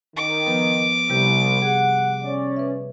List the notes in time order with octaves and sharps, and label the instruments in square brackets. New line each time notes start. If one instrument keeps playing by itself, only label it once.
[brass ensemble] D#3 [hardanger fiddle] D6
[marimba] F3 B3 B4
[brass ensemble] C2 [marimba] C3 G3 G4
[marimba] G#4 [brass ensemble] F#5
[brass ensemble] C#4 D5
[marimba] B4 E5